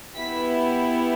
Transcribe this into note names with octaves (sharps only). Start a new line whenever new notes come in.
B3 E4 G4 B6